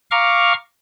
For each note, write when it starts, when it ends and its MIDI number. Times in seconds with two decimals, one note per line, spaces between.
0.11 0.53 77
0.11 0.53 82
0.11 0.53 85
0.11 0.53 86
0.11 0.53 89